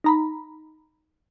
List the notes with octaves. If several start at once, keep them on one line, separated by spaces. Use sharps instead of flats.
D#4 A#5 B5